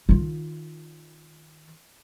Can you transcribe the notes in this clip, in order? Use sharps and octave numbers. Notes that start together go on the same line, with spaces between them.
D#3 F4